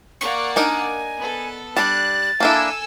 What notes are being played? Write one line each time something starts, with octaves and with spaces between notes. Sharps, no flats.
A#3 D5 F#5 C#6
D4 D#4 A#4 G#5
B3 A4
G3 D4 F#6 A6
A#3 D4 E4 A4 G#5 E6